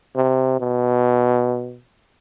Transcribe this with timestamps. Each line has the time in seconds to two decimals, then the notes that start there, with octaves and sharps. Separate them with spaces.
0.16 C3
0.60 B2